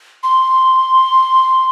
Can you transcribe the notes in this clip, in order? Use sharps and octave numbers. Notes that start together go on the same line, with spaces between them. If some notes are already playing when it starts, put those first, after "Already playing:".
C6